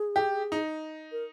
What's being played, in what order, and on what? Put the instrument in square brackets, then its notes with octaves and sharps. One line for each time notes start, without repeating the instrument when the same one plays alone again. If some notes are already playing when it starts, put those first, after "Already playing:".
Already playing: [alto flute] G#4
[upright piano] G4
D#4
[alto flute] A#4